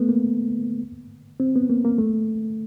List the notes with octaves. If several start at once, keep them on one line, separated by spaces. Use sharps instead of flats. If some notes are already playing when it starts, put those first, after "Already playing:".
Already playing: A3 B3
A#3
C4
B3
A#3
A#3
A3